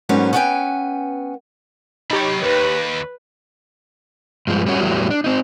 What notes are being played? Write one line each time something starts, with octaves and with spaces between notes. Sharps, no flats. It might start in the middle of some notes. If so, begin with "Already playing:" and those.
G#2 F#3 G3 A#3 C#4 B4
B3 C#4 B4 C#5 G5 G#5
F#3 D#4 G4 C#5 B5
D#2 B4
G2 F3 G#3
G3 C#4 F#4
E2 A2 E3 F#3 G3
D4
C4 D#4